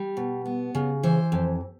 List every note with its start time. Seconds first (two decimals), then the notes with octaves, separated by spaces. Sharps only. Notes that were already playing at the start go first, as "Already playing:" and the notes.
Already playing: G3
0.17 B2
0.46 B3
0.75 C#3
1.03 E3 C5
1.32 F2